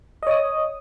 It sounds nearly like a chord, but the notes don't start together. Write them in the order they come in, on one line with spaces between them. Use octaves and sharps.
D#5 C#5 D#6